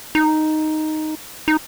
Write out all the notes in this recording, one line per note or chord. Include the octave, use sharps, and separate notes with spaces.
D#4
D#4